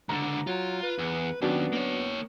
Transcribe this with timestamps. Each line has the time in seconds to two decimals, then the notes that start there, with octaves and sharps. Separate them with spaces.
0.09 C#2 D3 A#5
0.47 F#3 F4
0.83 B4
0.99 E2
1.42 D#2 F#3 B3 C#4 D4
1.73 A#3 C#5